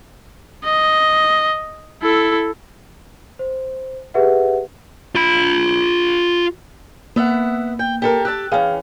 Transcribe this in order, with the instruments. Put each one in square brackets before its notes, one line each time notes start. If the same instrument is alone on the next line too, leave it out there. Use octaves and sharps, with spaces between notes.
[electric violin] D#5
E4 A4
[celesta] C5
G4 G#4 B4 E5 F#5
[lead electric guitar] F4 B5
[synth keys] A#3 [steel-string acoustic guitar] B3 E5 F#5
[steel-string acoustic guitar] G5
G4 A4 A#4
[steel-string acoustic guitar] G4 A5 [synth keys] E6 F#6
[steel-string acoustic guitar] E3 C#4 [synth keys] G#4 F5 G5